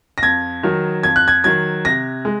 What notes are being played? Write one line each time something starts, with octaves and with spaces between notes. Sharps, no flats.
A#6
F2 G#6
D#3 F#3
F2 G#6
F#6
G#6
D#3 F#3 G#6
C3 A#6
G#3